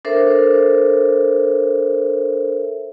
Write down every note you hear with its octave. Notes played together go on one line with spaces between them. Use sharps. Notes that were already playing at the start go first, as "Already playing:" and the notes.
D4 A4 A#4 C5 E5